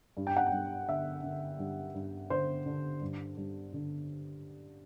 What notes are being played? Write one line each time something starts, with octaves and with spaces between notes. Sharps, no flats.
G2
G5
F#5
G5
G2
D3 E5
D3
G2
G2
D3 C5
D3
G2
G2
D3